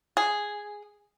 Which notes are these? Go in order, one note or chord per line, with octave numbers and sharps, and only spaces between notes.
G#4